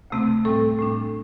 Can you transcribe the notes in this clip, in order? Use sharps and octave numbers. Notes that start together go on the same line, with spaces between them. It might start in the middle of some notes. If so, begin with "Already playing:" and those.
D2 C3 A3 C4
A2 G3 C4 A4
A2 G3 D4